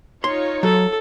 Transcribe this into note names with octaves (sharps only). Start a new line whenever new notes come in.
D#4 F4 C#5 C6
F#3 A4